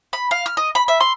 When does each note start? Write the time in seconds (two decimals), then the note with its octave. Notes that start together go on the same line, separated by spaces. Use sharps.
0.13 B5
0.31 F5
0.46 F6
0.57 D#5
0.75 B5
0.88 E5
1.00 C6